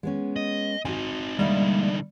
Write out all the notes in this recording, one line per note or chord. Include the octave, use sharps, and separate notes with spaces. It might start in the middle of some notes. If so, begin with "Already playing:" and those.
G#3 B3 C#4
D#5
C4 D#4 F#4 G#5
D3 G3 G#3 A#3 D#4 E5